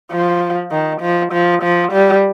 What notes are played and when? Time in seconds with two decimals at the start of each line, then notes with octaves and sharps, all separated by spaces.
0.11 F3
0.71 D#3
1.01 F3
1.33 F3
1.63 F3
1.92 G3